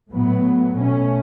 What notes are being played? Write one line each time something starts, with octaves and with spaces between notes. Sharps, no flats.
A2 F#3 B3
B2 A3 C#4